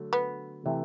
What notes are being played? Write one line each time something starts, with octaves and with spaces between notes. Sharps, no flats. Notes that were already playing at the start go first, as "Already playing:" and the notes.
Already playing: D3 F#3 A3
B3
C3 E3 A3